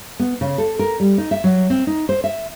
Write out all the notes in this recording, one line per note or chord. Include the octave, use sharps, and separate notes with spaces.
B3
C#3
A4
A#4
G3
D#4
E5
F#3
C4
D#4
C5
E5